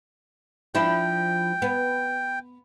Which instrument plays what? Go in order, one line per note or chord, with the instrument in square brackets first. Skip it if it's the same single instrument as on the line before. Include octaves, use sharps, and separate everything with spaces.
[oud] F3 D4 E4 [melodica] G5
[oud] B3